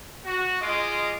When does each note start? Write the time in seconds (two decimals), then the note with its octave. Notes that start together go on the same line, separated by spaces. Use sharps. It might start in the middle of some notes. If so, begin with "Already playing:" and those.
0.24 F#4
0.61 G#3 F4 D#5 D6